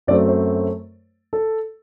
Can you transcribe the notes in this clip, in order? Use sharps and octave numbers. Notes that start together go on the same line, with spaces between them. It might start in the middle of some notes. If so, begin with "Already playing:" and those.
F#2 F#3 A3 C4 D5
C5
A4